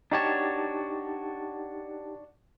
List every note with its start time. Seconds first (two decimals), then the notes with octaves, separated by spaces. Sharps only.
0.11 D4 D#4 F#4 G4 C#5 A5